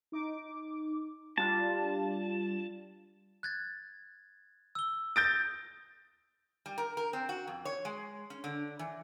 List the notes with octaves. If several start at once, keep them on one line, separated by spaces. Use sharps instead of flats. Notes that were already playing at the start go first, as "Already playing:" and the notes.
D#4 D6
G3 D4 F4 A5
F#6 G#6 A6
E6 G7
D#6 G6 A6 A#6 D7
G3
A#4
A#4
C4
F#4
F2
C#5
G#3
C#4
D3
E3